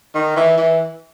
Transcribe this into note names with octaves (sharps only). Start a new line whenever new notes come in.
D#3
E3
E3